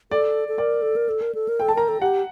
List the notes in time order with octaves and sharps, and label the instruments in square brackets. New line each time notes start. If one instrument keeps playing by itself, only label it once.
[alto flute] A4 [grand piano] D5
[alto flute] A4
[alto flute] A#4 [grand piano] D5
[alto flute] A4
A#4
A4
A#4
A4
A#4
[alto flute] A4 [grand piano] G5
[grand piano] A5
[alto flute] A#4 [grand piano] A#5
[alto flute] A4
[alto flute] G4 [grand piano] F#5